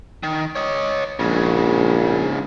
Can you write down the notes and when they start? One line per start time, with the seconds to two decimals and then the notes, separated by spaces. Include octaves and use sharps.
0.23 D#3
0.55 C#5 D#5
1.20 A#1 G#2 C#3